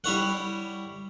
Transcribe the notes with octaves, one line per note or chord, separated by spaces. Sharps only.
G3 E4 C#5 F#5